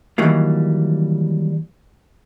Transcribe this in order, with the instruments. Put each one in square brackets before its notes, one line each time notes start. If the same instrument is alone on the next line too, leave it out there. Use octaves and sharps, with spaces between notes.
[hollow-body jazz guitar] D#3 E3 F#3 G3 A#3